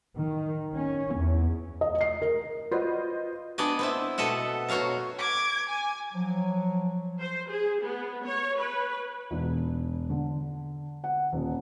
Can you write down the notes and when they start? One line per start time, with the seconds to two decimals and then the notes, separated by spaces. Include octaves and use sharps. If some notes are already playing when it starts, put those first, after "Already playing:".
0.17 D#3
0.74 C#4
1.15 E2
1.81 D#5
2.01 C7
2.22 A#4
2.71 F4 F#4 B4 C5 D#5
3.58 B3 D4 D5 D#5 G#5
3.79 B3 C4 E4
4.18 B2 A4 D#5 E5 F#5
4.69 B2 F#4 C#5 F5 A#5
5.18 D6 G#6
5.70 G#5
6.13 F3 F#3
7.20 C5
7.49 G#4
7.83 B3
8.26 C#5
8.59 B4
9.31 E1
10.10 D3
11.04 F#5
11.32 D#1